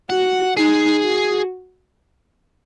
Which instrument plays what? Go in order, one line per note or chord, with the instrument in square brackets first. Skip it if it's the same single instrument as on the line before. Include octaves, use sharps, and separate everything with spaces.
[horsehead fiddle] F#4 [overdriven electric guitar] F#5
[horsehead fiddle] D#4 [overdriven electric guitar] G#4
[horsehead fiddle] F#4